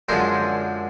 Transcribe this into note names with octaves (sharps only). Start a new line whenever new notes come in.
F#2 D3 F3 G#3 A#4 C5